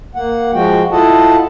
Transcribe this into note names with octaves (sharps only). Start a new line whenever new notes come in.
A#3 F#5
F3 G#3 F#4 G5
E4 F4 A4 D#5 F#5 A5